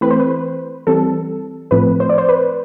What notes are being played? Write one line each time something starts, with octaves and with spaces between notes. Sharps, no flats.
E3 A3 C4 B4
C5
B4
E3 G3 C4 A4
A2 F3 A3 C4 B4
C5
D5
C5
B4